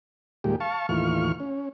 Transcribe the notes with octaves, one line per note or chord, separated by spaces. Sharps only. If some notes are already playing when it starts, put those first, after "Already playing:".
D#2 A#2 G3 G#3 G4
F5 A5 C#6
D#2 A2 E3 F4 C#6 F6
C#4